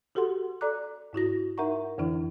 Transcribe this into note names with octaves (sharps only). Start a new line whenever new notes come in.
F#4 G4 A4 F#5 C6
A4 D5 A#5 D6 F#6
G#2 E4 F#4 A#6
D#4 A#4 E5 F#5 A#5 C#6
F2 D3 E3 D4 E4